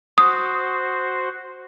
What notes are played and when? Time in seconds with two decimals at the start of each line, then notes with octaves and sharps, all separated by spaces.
0.18 F#4 C5 D#6